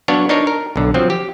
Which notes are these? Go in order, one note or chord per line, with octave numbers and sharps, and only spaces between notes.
F#3 B3 D4 C#5 F5
D4 D#4 A#4 C#5
A#4
B1 D3
F3 F#3 C4
G4